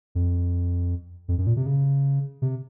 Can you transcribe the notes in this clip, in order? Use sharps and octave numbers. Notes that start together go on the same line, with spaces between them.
F2
F2
F#2
A#2
C3
C#3
C3